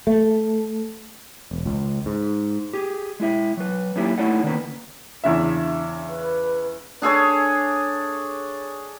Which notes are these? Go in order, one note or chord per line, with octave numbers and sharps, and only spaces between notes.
A3
E1
C#2
G#2
G4 G#4
G#3 E4 E5
F#3 B4
F#3 A#3 C#4 D#4 E4 G4
A3 D#4 E4 C#5 D5 F#5
D3 D#3 A#3 B3 C#4 B4
E2 C#3 D4 E5
B4
D4 G#4 A4 C#5